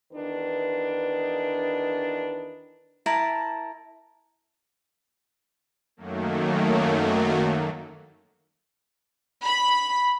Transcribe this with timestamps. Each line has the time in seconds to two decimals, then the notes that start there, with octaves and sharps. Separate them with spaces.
0.13 E2 D#3 D4 B4
3.06 E4 A#4 A5
5.97 F#2 D#3 F#3 A3 A#3
9.46 B5